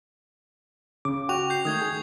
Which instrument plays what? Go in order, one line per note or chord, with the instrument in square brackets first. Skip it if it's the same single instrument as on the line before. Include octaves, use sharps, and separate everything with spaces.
[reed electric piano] C#3 [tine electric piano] D6
[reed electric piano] F#4 [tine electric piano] G5 [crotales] C#6 F7
[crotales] G6 C7
[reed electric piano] D#3 A3 G6 [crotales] D#6 G#6
[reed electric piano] G#4